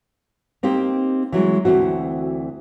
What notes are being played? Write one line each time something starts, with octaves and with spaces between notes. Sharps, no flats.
A#3 C4 D#4 G4
E3 F#3 G#3
D2 G2 E3 C4 F#4